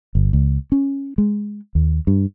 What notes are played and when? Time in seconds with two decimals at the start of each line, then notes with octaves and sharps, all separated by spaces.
0.15 G1
0.33 C#2
0.72 C#4
1.18 G#3
1.75 D#2
2.07 G2